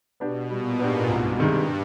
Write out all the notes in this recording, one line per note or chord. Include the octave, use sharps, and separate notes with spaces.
B2 B3 D4 G4
A#2 G3
G#2 B3 D4 G4
C2 G2
C3 D#3 G#3